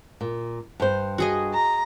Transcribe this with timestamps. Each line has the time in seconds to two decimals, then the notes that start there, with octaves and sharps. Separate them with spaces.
0.21 A#2
0.80 G2 C5
1.18 F#4 G#4 D#5
1.54 A#5